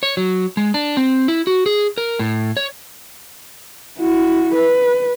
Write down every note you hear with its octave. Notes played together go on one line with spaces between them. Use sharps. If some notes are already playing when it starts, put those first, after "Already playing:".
C#5
F#3
G#3
D4
C4
E4
F#4
G#4
A#4
A2
C#5
E4 F#4
B4